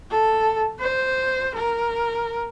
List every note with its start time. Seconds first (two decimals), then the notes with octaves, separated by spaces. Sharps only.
0.11 A4
0.80 C5
1.54 A#4